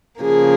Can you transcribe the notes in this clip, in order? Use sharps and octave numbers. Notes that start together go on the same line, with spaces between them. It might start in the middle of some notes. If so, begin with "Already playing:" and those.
C#3 F3 A#3 G#4